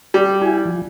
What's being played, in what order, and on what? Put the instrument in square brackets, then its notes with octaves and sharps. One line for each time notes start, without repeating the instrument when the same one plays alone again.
[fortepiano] G3
[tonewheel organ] E4 F#4 G#5
F3